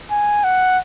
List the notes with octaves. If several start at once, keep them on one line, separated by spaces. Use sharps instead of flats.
G#5
F#5